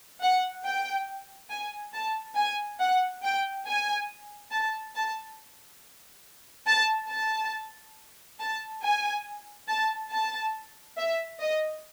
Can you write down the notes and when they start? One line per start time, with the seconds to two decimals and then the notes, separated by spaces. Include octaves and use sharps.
0.22 F#5
0.65 G5
1.50 G#5
1.94 A5
2.36 G#5
2.80 F#5
3.23 G5
3.67 G#5
4.52 A5
4.96 A5
6.67 A5
7.10 A5
8.39 A5
8.83 G#5
9.68 A5
10.12 A5
10.98 E5
11.41 D#5